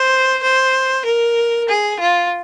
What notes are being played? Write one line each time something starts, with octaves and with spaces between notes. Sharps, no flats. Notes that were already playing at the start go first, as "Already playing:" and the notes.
Already playing: C5
C5
A#4
G#4
F4